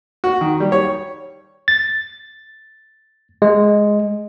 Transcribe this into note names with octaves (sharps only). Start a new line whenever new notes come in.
F#4
D#3
G3
C#5
A6
G#3